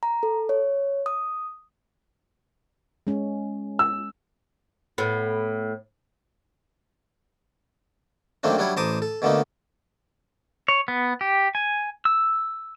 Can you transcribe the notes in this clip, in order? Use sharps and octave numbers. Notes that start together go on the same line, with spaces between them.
A#5
A4
C#5
D#6
G#3 C#4
E6
A2 B3
F#2 D#3 A3 A#3 C4 D4
F#3 G3 D4 E4 C#5
A1 C5 A5 A#5 D6 D#6
A4
B2 D3 A3 A#3 D#4
C#5
B3
G4
G#5
E6